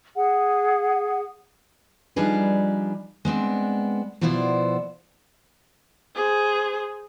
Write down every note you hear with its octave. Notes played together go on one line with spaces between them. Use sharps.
G#4 F#5
F3 G3 D4 D#4 G#4 B4
G#3 B3 C4 D4
B2 F3 B3 E4 C5 D5
G#4 C5